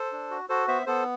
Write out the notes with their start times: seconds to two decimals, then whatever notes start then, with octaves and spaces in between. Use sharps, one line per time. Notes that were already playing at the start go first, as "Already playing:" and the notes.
Already playing: A4 C5
0.12 D4
0.31 F#4
0.49 F#4 A4 C5
0.68 B3 C5 E5
0.86 B3 A4 C5